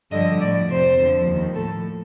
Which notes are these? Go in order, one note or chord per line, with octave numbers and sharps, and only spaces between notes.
G2 D3 F3 D#5
A2 F3 D5
F2 C3 F3 C5
F2 D3 F3
D#2 D#3
A2 F3 A4